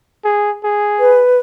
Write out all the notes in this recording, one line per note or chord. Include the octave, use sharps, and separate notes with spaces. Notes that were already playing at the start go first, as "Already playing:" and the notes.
G#4
G#4
B4